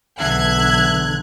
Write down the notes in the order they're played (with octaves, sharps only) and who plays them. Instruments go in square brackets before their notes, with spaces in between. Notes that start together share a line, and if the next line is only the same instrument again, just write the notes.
[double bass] B1 [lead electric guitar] E2 D3 [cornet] E5 [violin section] F#6 G#6